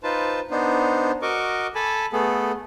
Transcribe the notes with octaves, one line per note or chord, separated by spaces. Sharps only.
D#4 F4 B4 C5 A5
B3 D4 D#4 C5
F#4 A#4 D#5 C#6 D6
A4 G#5 A5 B5
A3 B3 G#4 A4